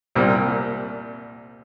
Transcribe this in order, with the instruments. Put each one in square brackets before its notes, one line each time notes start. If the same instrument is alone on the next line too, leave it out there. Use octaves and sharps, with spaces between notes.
[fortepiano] C2 A#2 G3 C4